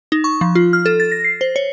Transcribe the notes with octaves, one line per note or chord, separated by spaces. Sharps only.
D#4
C#6
F3
F4
F6
A4
A6
A#6
C7
C5
C#5